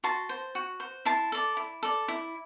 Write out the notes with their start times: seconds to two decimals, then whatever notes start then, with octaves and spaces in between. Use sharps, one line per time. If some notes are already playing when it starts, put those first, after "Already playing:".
0.04 F#4 A5 C6
0.29 C5
0.55 F#4
0.80 C5
1.05 E4 A5 C6
1.32 A4 D5
1.57 E4
1.83 A4 D5
2.08 E4